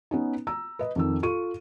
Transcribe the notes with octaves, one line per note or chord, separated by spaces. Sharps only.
B3 C#4 D#4
A#5 E6
B4 D#5
F2 D#3 E6
F4 A4 C#6 D#7